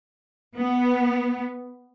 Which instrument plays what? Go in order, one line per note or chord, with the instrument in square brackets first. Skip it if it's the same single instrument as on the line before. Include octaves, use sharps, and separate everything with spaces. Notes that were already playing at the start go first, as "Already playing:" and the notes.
[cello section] B3